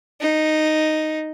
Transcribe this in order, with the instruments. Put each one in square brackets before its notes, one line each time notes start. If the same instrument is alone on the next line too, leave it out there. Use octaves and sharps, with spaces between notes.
[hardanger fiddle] D#4